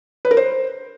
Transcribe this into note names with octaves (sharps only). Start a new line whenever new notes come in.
B4
A#4
C5